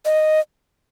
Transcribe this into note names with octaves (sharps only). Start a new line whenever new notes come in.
D#5